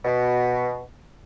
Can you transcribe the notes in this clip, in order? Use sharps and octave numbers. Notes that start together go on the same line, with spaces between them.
B2